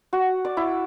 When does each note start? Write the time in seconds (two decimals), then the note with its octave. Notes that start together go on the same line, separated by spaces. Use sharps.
0.13 F#4
0.45 D5
0.57 E4